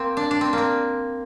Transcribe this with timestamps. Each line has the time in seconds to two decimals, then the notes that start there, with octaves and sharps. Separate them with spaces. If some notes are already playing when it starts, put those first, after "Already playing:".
Already playing: A#3 C4
0.17 D4
0.31 D4
0.41 C4
0.53 A#3 C4